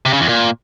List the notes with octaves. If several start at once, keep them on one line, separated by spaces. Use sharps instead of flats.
C3
C#3
E2
A#2